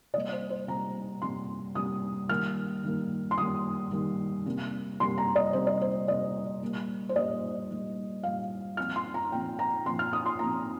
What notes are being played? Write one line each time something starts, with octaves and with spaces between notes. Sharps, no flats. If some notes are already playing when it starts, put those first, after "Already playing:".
C3 G3 A#3 D#5
C5
C5
C3 G3 A#3 A#5
C3 G3 A#3 C6
C3 G3 A#3 D#6
D#3 G3 A#3 F6
D#3 G3 A#3
C6
D#3 G3 A#3 D#6
D#3 G3 A#3
C3 G3 A#3
C3 G3 A#3 C6
A#5
D#5
C3 G3 A#3 C5
D#5
C5
C3 G3 A#3 D#5
A#2 G3 A#3
C5
A#2 G3 A#3 D#5
A#2 G3 A#3
A#2 G3 A#3 F5
A#2 F3 C4 F6
C6
A#5
A#2 F3 C4 G5
A#5
A#2 F3 C4 C6
F6
D#6
C6
A#2 F3 C4 A#5